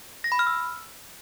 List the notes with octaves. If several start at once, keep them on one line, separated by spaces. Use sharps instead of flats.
A#6
B5
F6
E6